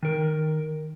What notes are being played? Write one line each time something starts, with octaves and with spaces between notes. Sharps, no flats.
D#3 A#4